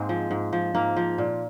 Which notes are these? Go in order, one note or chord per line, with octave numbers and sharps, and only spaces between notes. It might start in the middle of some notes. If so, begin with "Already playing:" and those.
Already playing: G#2 G#3 A#3 C4
F3
G#2
F3
G#2 A#3
F3
A#2